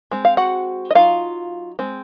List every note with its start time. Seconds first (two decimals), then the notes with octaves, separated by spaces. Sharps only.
0.11 G#3 C4
0.25 F5
0.37 F#4 F#5
0.91 D#5
0.95 F#3 C4 D#4 F4 F5
1.79 G#3 C4